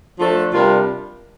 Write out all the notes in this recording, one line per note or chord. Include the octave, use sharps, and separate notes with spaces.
F3 A3 D4 A4
C3 G3 D4 F4 A#4